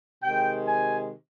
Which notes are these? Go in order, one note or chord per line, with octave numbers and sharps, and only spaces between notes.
C3 D#3 G#3 G5
G#5